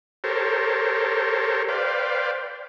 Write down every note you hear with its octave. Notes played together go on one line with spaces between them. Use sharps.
G4 A4 A#4 C5 C#5
B4 C5 D5 F5 G5